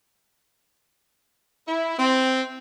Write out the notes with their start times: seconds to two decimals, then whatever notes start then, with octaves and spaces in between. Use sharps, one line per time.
1.68 E4
1.99 C4